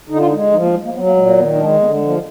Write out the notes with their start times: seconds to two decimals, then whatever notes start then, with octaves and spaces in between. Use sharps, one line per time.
0.09 D3 D#4
0.18 F4
0.27 D#4
0.31 G#3
0.52 F3 D#4
0.63 A#3
0.74 G#3
0.85 A#3
0.95 F#3 B3
1.06 A#3
1.16 A#2 G#3
1.27 A#3
1.38 D#3 B3
1.55 D#4
1.59 G#3 D4
1.81 D3 B3
1.95 G#3
2.02 F3
2.09 A#3